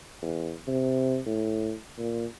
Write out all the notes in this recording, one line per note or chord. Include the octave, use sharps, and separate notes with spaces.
E2
C3
A2
A#2